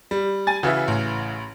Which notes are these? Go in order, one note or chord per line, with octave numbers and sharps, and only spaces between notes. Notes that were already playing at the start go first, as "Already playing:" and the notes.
G3
G#5 A6
C#3 E3 F#4 E5
A1